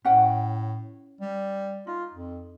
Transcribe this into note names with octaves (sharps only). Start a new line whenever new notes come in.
A2 C#4 F#5 G5
G3
D#4 F4
F2